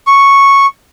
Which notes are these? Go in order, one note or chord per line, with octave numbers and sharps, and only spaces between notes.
C#6